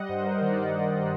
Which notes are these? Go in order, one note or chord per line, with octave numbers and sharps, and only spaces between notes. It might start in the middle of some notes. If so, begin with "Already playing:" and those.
Already playing: G3 D#5 F#5
G2 C5
A#4
C5
D#3 D5
D#3